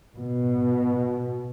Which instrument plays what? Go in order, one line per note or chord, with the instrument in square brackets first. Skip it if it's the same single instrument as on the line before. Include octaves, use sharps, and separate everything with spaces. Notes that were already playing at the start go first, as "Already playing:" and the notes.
[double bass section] B2